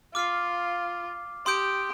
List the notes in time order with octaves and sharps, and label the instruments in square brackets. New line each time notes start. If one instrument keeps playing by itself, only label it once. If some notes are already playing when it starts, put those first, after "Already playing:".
[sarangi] F4 [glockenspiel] D6 F6 C7
[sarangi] G4 [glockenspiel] C6 D#6 G6 D7